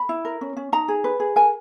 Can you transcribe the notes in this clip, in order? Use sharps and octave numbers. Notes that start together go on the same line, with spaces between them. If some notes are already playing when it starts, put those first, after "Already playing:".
Already playing: B5
E4
A#4
C#4
C#4
D#4 A#5
G#4
B4
G#4
A#4 G#5